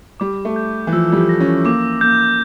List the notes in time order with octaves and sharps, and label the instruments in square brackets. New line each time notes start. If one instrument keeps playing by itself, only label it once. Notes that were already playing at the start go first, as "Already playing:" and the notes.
[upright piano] G3 [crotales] D6
[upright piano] A3
[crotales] G6
[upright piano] E3
[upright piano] F3 [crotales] E6
[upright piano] G3
F3
[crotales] A#6
[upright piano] C#4
[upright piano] A#3 [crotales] D6
[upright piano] A#3 [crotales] G6